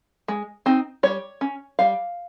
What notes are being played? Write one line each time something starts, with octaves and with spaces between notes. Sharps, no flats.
G#3
C4 D#4
G3 C#5
C#4
G3 F5